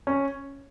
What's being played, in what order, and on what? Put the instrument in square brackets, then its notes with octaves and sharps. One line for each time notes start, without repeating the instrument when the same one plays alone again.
[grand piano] C#4